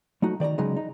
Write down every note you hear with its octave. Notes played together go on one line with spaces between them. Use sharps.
F#3 A3 D#4 F#4
D#3 D5 D#5 A#5
C#3 F#3 G#3 D#4
D#4